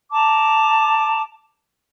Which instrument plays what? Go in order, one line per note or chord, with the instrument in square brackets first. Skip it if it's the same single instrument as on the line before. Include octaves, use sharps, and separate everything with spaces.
[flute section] A5 A#5 D6